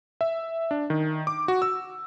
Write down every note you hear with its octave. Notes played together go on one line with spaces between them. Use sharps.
E5
D4
D#3
D6
F#4
E6